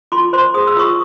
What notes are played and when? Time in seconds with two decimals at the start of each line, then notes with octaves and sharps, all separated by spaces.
0.12 F4 C6 D6
0.33 C5 C6 D6
0.54 G#4 D#6
0.67 E6
0.77 F4 C#6 D#6